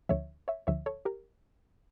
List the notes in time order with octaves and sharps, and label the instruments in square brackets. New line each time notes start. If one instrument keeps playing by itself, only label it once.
[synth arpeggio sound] D2 D3 F3 C#5 E5
C#5 E5
D2 D3 F3 C#5 E5
A4 C#5
G4 A#4